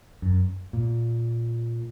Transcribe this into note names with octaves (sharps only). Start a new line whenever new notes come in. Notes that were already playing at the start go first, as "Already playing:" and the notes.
F#2
A#2